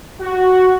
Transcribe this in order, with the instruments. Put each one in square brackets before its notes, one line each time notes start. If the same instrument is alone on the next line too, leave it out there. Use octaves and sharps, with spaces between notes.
[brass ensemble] F#4